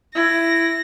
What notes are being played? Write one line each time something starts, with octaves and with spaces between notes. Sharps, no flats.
E4 A#6